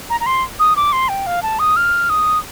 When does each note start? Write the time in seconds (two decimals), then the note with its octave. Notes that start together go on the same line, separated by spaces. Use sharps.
0.10 A#5
0.21 A#5
0.26 C6
0.59 D#6
0.76 D6
0.92 C6
1.09 G5
1.27 F5
1.43 A5
1.59 D#6
1.76 F6
2.10 D#6